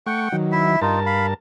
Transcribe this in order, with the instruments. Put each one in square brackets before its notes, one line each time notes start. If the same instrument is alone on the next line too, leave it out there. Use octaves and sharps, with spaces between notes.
[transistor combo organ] A3 C#6 [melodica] F#5 G5
[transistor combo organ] D#3 F#3
[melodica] E4 E5
[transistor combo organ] G2 A#4 A5 [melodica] D#4 F4
[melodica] F5 B5